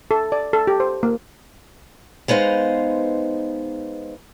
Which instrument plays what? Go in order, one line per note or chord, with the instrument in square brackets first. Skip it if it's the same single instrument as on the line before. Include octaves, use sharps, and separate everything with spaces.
[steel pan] A4
D5
A4
G4
C5
A#3
[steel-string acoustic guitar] G#3 B3 D#4 C5 F5